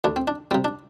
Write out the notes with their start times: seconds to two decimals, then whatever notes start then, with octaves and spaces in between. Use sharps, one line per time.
0.04 D2 D4
0.16 C4
0.28 D4
0.51 C3 G3 C4
0.65 D4